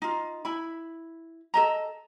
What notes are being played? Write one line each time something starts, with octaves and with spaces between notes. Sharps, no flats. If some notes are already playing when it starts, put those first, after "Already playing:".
D#4 F4
E4 B5
A4 D#5 A#5